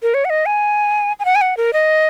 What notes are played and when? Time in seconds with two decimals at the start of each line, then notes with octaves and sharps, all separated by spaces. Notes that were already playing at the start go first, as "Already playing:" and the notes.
0.03 A#4
0.14 C#5
0.25 F#5
0.30 D#5
0.46 G#5
1.20 G#5
1.25 F#5
1.35 G#5
1.41 F#5
1.57 A#4
1.73 D#5